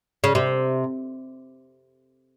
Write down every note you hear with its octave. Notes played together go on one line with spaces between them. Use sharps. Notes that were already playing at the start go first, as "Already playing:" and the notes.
C#3
C3